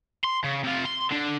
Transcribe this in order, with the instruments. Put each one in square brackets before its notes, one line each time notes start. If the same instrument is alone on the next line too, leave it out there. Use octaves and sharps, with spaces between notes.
[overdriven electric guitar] C6
C#3
C3 F4
C6
D3 D4